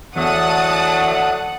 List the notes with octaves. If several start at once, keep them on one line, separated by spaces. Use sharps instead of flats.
E2 D3 F#3 A3 F#5 A5 D#6